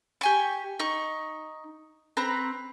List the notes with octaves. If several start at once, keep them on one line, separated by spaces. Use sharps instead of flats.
G4 G#5 C#6
D#4 C#6
C4 B4 A#5